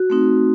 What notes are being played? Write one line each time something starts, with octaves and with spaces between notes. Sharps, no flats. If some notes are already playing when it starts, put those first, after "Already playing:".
Already playing: F#4
A3 C4 D#4